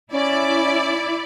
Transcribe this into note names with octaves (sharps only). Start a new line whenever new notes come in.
C#4 E4 D5